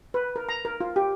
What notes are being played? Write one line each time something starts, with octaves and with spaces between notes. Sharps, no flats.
B4
A#4
A#5
A#4
F4
G4